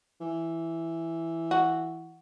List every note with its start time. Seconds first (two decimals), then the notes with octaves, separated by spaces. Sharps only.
0.21 E3
1.51 F#4